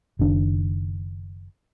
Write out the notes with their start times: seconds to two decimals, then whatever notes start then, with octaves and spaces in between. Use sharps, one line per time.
0.19 F#1 D#3 D4